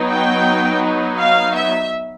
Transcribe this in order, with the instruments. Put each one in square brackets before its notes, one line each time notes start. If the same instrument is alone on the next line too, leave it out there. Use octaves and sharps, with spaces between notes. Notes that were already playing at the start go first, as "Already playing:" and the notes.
Already playing: [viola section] F#3 B3 D#4
G5
F5
E5